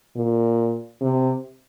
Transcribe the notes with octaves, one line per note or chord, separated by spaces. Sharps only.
A#2
C3